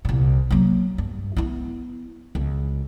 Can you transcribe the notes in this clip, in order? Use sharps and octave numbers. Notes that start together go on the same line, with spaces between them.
C2 A#2
F#3 A#3
G2
B3 E4
C#2